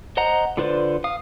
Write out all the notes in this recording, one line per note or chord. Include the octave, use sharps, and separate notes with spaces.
C5 D#5 F#5 A#5
D3 F4 B4 C5 D5
F5 D#6